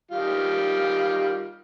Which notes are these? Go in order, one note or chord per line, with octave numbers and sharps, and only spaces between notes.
D#3 G3 F4